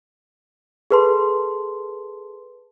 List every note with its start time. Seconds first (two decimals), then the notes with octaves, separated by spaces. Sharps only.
0.91 G#4 A4 B4 A5 C6